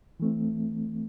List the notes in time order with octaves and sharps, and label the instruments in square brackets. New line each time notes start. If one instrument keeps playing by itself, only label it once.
[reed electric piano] E3 A3 C4